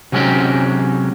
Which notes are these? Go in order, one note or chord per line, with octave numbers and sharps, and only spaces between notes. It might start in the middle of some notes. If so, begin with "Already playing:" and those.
C3 F#3 G#3 C#4 D#4 G4